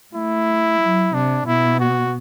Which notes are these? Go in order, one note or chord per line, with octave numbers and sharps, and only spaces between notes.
A3 E4
F#3
C3 D4
B2 E4
F#4